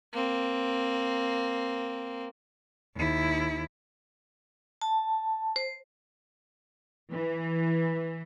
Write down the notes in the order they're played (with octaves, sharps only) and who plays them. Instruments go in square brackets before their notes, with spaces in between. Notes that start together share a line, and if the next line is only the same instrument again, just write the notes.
[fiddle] A#3 C4
[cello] D#2 E4
[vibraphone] A5
C5
[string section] E3